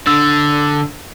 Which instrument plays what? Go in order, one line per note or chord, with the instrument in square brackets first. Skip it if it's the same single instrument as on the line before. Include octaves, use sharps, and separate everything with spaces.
[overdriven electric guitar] D3 [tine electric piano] E6